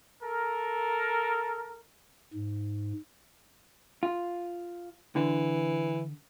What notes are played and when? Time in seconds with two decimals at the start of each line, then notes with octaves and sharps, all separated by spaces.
0.22 A4 A#4
2.33 G#2
4.03 F4
5.16 D3 E3